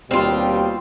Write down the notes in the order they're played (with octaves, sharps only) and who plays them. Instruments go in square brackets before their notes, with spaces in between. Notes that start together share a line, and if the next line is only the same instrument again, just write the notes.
[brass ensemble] D#2 B2 G3 [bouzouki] C4 F4